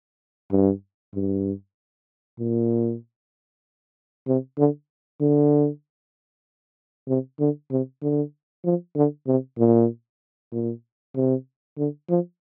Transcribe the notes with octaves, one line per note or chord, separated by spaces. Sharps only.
G2
G2
A#2
C3
D3
D3
C3
D3
C3
D3
F3
D3
C3
A#2
A#2
C3
D3
F3